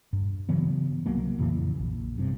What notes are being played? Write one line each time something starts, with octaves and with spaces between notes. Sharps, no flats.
G2
C#3 E3 F#3 B3
C2 F#3 A#3
F2 A#2 C#3 E3
A#1
G2 C3